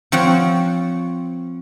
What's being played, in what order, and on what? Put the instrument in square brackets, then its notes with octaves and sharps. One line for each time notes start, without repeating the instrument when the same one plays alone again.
[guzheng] F3 C4 C#5 F#5